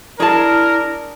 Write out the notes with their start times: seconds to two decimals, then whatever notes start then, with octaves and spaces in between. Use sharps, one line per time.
0.20 D4 E4 G#4 A#4 A5